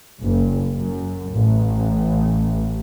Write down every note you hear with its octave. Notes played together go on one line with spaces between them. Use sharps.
F#1
F#2
A1